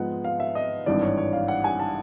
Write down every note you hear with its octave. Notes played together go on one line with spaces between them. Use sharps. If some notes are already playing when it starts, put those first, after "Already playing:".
Already playing: G#2 F3 G#3 B3 F#5
F5
E5
D#5
G#1 G2 E3 D5
C#5
C#5
F5
F#5
G#5
A5